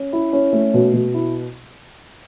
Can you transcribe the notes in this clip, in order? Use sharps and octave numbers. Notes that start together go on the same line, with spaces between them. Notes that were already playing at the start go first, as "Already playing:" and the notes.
Already playing: C#4
E4
C#4
A3
B2
B2
E4